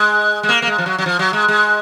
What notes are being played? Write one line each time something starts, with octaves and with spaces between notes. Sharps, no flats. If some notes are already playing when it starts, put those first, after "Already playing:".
Already playing: G#3
G#3
A#3
A#3
G#3
F3
F#3
F#3
F3
F#3
G#3
G#3